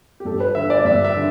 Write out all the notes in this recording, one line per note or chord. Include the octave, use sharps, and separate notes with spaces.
G4
G2 A4
B4
D3 E5
D5
G2 E5
E5
D3